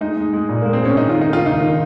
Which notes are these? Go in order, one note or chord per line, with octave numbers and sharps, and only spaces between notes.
G#3 D#4
G#3
G#3
A#2
A#3
G#3
C4
G#3 C#4
D#3 D#4
F4
D#3
D#4
A#3 F4
D#2 D#4
D#3